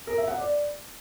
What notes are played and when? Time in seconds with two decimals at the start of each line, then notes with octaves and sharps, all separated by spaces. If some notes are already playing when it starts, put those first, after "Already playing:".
0.07 A#4
0.17 E5
0.28 F#5
0.38 D5